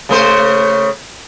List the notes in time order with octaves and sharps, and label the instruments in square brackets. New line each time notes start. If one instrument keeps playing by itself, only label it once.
[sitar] C#3 A3 C5